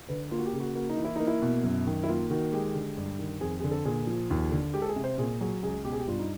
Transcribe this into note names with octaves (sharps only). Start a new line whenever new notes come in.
D3 B4
A#3 F4
F#4
G4
C#3
F#4
A#3 F#4
D#4
E3
E4
A#3 D#4
E4
B2
F#2
D#3
E4
A#3 F4
D#3 F#4
G#3 G4
D3
G2
D#3
F2 G#4
D3 G#4
A4
A#2 G#4
F3
D#2
D3
G#3 G4
A4
G#4
C3
C5
A#2 G#4
F#3 G#4
C#2 G#4
B2 G4
G#4
G4
G2 F4
D#4